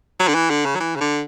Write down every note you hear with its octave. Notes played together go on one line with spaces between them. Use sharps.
F#3
D3
E3
D3
C#3
F#3
E3
C#3
D3